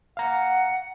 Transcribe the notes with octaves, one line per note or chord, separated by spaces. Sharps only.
F5 F#5 A#5